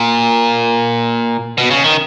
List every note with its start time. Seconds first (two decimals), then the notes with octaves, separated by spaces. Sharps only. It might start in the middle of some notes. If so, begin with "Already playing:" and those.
Already playing: A#2
1.58 B2
1.70 C#3
1.84 D#3